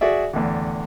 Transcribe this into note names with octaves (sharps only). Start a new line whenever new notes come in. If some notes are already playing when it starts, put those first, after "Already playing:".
F#4 G#4 D5 E5
E2 A2 D3